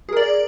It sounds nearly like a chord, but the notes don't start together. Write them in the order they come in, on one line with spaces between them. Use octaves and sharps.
G#4 A#4 D5